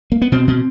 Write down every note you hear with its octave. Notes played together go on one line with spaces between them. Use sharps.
A#3
B3
B2 C4
B2